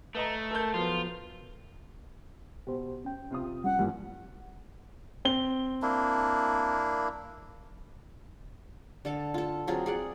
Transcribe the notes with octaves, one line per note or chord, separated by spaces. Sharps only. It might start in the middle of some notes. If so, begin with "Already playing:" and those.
A3 B4 D#5 A#5
A4 A#4 G6
F3 F#3 B3 F4
B2 G4 C5
C#4 G5
C3 F4 D#6
G3 C#4 F#5
G2 E3 F3 A#3 G4
C4 G7
A#3 D4 E4
D3 A4 F5
F4 A4
F#3 C4 F4 G#4
G#4 D5 F#5